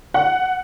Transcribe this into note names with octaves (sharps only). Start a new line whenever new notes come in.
F#5